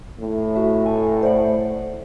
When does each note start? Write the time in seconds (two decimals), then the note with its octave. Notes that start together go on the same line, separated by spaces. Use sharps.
0.20 A2
0.55 F#4 E5
0.86 G#5
1.22 C5 D5 F#5